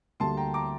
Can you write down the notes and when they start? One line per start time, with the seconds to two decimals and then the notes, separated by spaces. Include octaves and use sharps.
0.20 D2 D3 G3 A#3 A5 C6
0.37 G5 A#5
0.54 A#5 D6